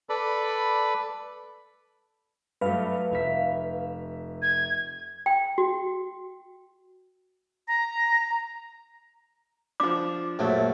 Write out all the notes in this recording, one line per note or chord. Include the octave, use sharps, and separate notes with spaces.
A4 B4 D5 B5
G2 F#3 A3 B4 F5
F1 E5 B6
G#6
G5
F#4
A#5 A#6
F3 D4 D6
A#1 F#2 F#3 A3